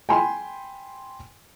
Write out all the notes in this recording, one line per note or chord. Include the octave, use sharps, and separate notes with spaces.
G5 G#5 B5 C6